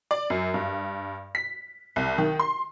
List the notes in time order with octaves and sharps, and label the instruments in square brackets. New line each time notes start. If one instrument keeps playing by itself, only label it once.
[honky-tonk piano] D5
F#2
G2
B6
C2
D#3
C6